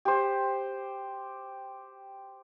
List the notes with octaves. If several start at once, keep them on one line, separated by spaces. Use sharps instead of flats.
G4 C5